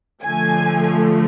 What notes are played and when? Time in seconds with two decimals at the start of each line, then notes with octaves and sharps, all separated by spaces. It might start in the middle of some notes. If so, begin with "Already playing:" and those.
0.23 D3 F3 A3 G#5